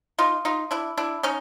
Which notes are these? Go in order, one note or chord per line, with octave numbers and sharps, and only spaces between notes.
D#4 F4
D#4 F4
D4 E4
D4 E4
C#4 D#4